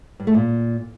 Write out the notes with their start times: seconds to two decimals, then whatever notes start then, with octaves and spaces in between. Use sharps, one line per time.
0.20 G2
0.27 A3
0.34 A#2